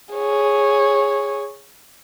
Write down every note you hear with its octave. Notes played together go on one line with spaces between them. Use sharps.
G#4 C#5